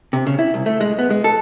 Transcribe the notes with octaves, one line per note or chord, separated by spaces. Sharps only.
C3
C#3
E4
C2
A3
G#3
B3
G#3
A4